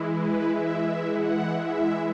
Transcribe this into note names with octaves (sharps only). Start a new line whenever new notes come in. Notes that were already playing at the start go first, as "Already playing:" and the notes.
Already playing: E3 G#3 E4
B4
E5
E5
F#5
E5